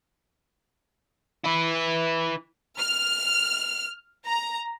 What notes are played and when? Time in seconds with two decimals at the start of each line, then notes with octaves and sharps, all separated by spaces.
1.45 E4 B4
2.78 F6
4.25 A#5